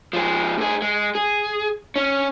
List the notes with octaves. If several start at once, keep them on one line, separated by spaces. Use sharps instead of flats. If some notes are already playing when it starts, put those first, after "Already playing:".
F3 G#3
A2 G#4
G#3
G#4
C#4